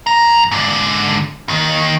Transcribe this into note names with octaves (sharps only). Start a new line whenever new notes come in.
F#2 A#5
G#2 D3
D#2 D#3